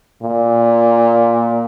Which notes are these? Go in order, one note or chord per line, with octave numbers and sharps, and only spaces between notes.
A#2